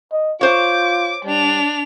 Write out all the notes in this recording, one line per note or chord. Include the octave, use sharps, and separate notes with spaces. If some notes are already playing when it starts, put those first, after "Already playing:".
D#5
F4 C5 C#5 D6
G3 D4 F7